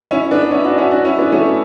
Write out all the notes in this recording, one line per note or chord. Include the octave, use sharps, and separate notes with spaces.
C#4 E4
B3 D4
C#4 E4
D4 F#4
C#4 E4
D4 F#4
C#4 E4
B3 D4
A3 C#4